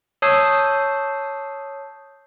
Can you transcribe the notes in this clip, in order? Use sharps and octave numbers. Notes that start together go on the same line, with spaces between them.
C#5 A5 D#6 E6 G6 C7